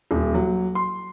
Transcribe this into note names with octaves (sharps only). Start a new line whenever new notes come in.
D#1
F#3
C6